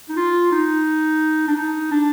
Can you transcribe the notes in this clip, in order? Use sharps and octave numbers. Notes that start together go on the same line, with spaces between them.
D#4
F4
D#4
D4
D#4
D4